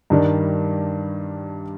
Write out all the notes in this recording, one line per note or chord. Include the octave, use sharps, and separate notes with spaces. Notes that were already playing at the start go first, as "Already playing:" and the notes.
G2 D#3 G3 D4